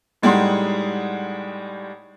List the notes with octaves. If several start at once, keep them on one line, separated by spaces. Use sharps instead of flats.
A2 G3 G#3 D#4 F#5 C6